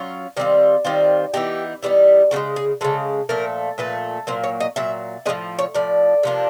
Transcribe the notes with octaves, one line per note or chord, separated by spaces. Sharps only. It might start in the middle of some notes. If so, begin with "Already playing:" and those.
Already playing: F#3 C#4 F4
D#3 G3 C4 F4
D#3 G3 C4 F4
E3 G3 B3 D#4 G4
E3 G3 B3 D#4
C#3 E3 G#3 F#4
G#4
C#3 E3 G#3 A4
A#2 F3 A3 A#4
A#2 F3 A3 B4
A#2 F#3 A#3 C5
C#5
D#5
A#2 F#3 E5
A2 F3 G#3 B3 D#5
C#5
A2 F3 D5
C3 F3 A#3 D4